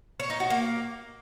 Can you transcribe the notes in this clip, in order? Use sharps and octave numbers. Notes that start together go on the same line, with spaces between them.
C#5
D#4
F#4
A#3